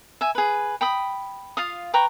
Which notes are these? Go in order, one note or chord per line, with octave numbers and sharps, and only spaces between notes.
E5 G#5
G#4 B4
G5 B5 D#6
F4 F5 D#6
B4 G5 A#5 C#6